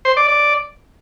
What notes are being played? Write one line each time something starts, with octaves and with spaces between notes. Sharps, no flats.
C5
D5
D5